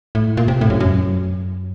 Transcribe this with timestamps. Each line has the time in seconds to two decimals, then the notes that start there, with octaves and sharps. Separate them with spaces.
0.15 A2
0.37 A#2
0.48 C3
0.61 A2
0.70 F#2
0.80 F#2